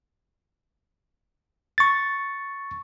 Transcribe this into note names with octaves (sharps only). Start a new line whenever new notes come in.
C#6 A6